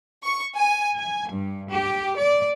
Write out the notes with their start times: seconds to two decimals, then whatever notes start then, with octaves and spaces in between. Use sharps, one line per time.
0.23 C#6
0.55 G#5
0.96 G#5
1.30 G2
1.70 G4
2.17 D5